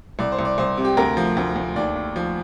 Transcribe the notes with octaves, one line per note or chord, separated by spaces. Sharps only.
C2 D5
C5
C2
D5
C2 C5
C3
G4
D2 A#4
F3
D2
D2
D#2 D5
D#2
F3